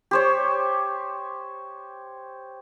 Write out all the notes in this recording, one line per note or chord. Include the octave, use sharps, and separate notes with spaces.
G4 C5 C#5